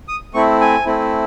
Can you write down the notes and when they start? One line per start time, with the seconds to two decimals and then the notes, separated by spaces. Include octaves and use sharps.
0.08 D#6
0.34 A3 C4 E4 C#6
0.61 G#5
0.85 A3 C4 E4